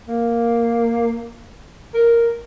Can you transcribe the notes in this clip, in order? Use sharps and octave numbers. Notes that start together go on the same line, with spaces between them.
A#3
A#4